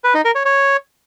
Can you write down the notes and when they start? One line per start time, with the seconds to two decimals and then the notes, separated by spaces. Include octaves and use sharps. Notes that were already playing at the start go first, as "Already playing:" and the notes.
0.04 B4
0.14 D#4
0.25 A#4
0.35 C#5
0.45 C#5